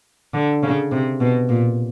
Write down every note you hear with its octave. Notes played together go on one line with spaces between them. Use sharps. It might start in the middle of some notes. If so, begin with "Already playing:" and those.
D3
C#3
C3
B2
A#2